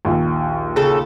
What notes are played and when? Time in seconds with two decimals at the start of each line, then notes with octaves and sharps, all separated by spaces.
0.05 A#1 D#2
0.76 C#3 A4